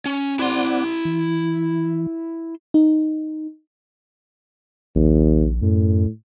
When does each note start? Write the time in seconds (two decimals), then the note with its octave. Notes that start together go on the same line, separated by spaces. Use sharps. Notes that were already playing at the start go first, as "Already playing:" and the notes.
0.06 C#4
0.39 C4 E4 D5 F#5 C6
1.05 E3
2.74 D#4
4.95 A#1 D#2
5.62 F#2 A2